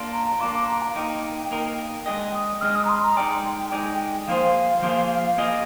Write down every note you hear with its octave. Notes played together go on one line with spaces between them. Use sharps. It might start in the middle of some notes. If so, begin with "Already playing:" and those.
Already playing: A#3 D4 F4
A#5
A#3 D4 F4 D6
D6
A#5
F5
A#3 D#4 A#4 G5
A#3 D#4 A#4
G#3 D4 G#4 D#5 G5
D#6
G#3 D4 G#4 D#5 F6
D#6
A#5
C6
A#5
G#3 D#4 G#4 D5 G5
G#3 D#4 G#4 D5
F3 A#3 F4 G#4 C5 F5
F3 A#3 F4 G#4 C5
A#3 F4 G#4 D#5